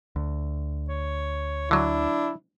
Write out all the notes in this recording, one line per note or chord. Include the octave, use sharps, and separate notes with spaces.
D2
C#5
D3 F#3 D4 E4